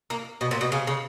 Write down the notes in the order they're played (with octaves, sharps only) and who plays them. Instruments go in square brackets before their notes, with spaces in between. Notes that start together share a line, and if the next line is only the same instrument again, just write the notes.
[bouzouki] A#3
B2
A#2
B2
C#3
C#3